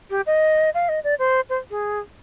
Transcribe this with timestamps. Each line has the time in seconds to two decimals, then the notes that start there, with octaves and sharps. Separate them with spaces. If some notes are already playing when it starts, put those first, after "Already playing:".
0.10 G4
0.27 D#5
0.74 F5
0.89 D#5
1.04 D5
1.19 C5
1.49 C5
1.70 G#4